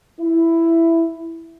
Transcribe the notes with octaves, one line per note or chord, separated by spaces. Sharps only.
E4